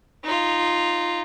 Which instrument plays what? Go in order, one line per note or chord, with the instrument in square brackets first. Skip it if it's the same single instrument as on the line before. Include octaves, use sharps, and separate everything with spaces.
[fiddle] D#4 F4